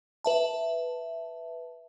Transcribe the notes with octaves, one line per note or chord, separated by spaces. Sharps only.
B4 E5 A5